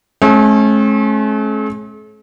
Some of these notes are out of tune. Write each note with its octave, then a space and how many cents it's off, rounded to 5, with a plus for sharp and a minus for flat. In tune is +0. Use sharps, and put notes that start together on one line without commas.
A3 -45 C#4 -35